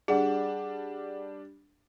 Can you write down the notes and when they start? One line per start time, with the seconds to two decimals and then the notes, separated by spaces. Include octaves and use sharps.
0.08 G3 D4 G#4 F#5